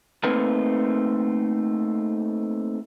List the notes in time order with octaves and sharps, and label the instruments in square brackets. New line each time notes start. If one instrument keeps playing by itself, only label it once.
[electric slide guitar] A3 A#3 C4 D#4 A#4 B4